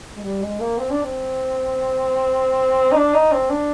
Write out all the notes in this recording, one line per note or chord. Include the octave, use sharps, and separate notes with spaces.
G#3
G3
G#3
A#3
C4
D4
C4
D#4
D4
D#4
C4
D4